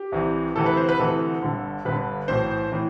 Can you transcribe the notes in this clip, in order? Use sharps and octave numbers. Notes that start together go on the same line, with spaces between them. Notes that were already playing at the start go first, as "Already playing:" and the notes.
Already playing: G4
C2 C3 E3
D2 C3 E3 A4
B4
C5
B4
D2 C3 E3 A4
G1 G2 D3
G1 G2 D3 B4
B1 A2 E3 C5
A2 E3